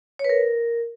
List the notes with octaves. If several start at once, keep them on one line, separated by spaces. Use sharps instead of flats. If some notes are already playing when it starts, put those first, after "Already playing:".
C#5
B4
A#4